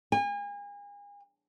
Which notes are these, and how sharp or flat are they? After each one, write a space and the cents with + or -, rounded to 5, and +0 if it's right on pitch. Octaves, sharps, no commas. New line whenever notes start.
G#5 -35